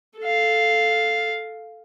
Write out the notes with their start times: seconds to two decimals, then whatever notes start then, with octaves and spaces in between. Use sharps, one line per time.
0.19 A4 F5